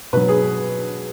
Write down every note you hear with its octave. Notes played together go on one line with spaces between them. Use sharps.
B2 F#3 B4
G#4